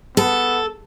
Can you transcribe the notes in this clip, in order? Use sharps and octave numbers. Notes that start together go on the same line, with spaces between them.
B3 A4